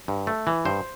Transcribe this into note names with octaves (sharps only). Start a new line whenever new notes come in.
G2
A3
E3
G2 C5